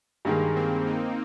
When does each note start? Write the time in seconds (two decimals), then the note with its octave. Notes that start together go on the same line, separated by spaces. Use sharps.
0.25 G2 D#3 G#3 A#3
0.56 C4
0.86 D#4